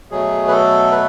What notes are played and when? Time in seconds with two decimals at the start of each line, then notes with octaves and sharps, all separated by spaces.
0.11 B2 F#3 A3 G#4
0.48 B4
0.52 A4
0.92 B4